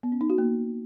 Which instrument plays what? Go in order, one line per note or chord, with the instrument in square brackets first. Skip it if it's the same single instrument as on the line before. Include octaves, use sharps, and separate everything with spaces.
[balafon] B3
C#4
D#4
F#4
A#3